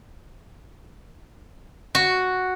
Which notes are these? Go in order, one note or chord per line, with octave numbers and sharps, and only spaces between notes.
F#4